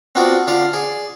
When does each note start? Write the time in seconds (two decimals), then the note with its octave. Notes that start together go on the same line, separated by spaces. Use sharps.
0.15 B3 C4 D4 F4 F#4 D5
0.47 D3 F4 D5 F5
0.73 G#4 D5